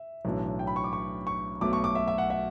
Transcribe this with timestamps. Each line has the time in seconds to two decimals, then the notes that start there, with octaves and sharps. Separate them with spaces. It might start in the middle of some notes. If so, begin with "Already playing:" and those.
Already playing: E5
0.25 B1 A2 E3 A3 D4
0.59 G5
0.67 B5
0.76 C#6
0.84 D6
0.93 C#6
1.27 C#6
1.61 B1 B2 A3 D6
1.73 C#6
1.84 D6
1.95 E5
2.08 E5
2.18 F#5
2.30 E5